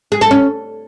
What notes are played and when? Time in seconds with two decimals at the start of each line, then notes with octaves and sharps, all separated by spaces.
0.12 G#4
0.21 A4
0.31 C#4